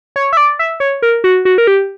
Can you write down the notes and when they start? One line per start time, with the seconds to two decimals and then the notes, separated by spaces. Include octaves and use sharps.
0.16 C#5
0.33 E5
0.37 D5
0.59 E5
0.80 C#5
1.02 A#4
1.24 F#4
1.45 F#4
1.58 A#4
1.67 G4